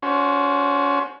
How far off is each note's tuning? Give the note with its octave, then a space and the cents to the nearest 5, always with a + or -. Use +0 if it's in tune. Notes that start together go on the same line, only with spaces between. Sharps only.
C#4 +30 F#4 -15 C5 +15